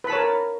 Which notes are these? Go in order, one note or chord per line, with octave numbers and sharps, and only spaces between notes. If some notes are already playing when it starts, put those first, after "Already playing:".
A#4 B4 C#5 A5 B5